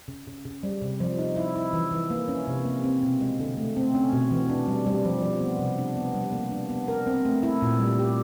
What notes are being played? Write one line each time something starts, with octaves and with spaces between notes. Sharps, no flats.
C#3
C#3
C#3
G3
C3
F3
D#4
E4
E4
E3
E3
A#3
C#4
C3
A#3
C4
B2
G#3
D3
A3
C4
C#4
B2
E3
D4
G3
G3
F3
F3
B3
C3
D4
B3
G3
A#3
D4
B3
A#4
C4
A3
E4
A#2
G3
G4